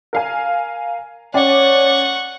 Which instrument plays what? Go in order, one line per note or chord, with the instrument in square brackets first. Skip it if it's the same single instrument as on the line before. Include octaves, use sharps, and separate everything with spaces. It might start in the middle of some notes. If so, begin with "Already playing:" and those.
[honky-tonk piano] A#4 F5 G#5
[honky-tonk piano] C#4 D5 [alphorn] C#5 [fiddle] F#5 C#6